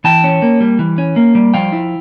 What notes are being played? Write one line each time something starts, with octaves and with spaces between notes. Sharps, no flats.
E3 G5 A5
C#4
A#3
G3
E3
C#4
A#3
G3
F3 F5 G5
E4